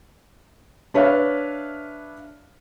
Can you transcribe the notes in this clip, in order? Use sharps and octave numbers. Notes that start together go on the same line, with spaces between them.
D4 B4 C#5 E5 F5